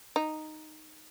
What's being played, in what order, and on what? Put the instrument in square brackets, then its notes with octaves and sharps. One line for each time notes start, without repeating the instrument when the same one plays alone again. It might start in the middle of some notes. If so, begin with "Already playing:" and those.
[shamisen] D#4